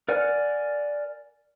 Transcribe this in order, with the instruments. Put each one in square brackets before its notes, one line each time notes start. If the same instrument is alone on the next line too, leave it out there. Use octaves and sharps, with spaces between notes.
[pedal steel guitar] A#4 D5 F#5 G#5 F6